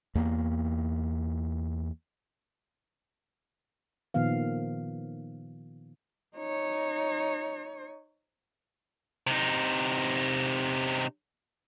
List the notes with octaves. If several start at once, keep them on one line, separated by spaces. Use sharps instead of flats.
E2 A#3
A#2 D#3 F3 B3 F5
D#4 C#5
C3 D#4